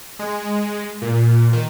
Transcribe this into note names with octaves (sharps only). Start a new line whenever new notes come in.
G#3
A#2
D#3